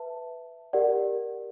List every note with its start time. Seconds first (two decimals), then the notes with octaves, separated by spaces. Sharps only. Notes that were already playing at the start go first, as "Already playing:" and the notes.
Already playing: B4 E5 A5
0.73 G4 A#4 D5 F#5